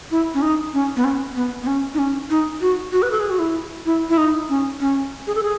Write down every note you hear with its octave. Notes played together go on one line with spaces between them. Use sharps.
E4
C#4
D#4
C#4
B3
C#4
B3
B3
C#4
D#4
C#4
D#4
F#4
F#4
B4
A4
G#4
F#4
E4
E4
E4
D#4
C#4
C#4
G#4
A4
G#4